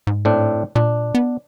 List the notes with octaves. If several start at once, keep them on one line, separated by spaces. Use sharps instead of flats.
G#2
A2 C4 D4
A#2 D4
B3